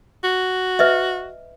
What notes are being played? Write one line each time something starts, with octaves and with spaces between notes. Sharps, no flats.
F#4
B4 D#5 E5